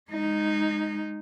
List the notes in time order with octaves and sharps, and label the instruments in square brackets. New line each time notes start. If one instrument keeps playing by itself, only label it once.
[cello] G#3 D#4